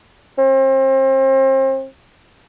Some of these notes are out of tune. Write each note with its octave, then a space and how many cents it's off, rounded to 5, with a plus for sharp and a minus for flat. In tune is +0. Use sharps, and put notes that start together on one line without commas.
C4 +35